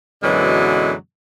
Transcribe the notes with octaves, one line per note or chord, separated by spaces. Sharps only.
F#2 B2 D3 E3 F#3 G#3